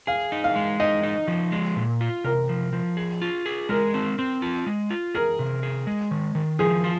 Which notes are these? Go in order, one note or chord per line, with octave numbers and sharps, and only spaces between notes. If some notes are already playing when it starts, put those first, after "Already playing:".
G#4 F5
D#4
F5
G#3
D#4 D#5
D#4
F3
G#3
A#2
F4
C3 A#4
F3
F3
G#4
F4
G#4
G#3 A#4
C4
C4
F4
G#3
F4
G#4 A#4
C3
G#4
G#3
D#3
D#3
F3 G#4
F4